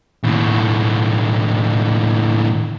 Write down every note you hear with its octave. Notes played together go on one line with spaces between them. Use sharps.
D#2 A2